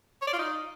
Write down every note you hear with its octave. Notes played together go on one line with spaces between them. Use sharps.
C#5
D5
F4
D#4